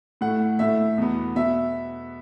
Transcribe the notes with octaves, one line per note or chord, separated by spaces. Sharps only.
A2 A3 F#5
A2 A3 E5
E2 B2 B3
B2 B3 E5